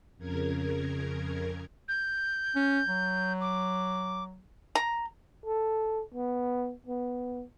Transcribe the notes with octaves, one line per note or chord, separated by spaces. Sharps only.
F2 C#3 A#4 G#6
G6
C#4
F#3
D6
A#5
A4
B3
B3